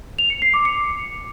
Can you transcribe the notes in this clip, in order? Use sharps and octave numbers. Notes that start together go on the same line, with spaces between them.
F7
C#7
C7
D6
C#7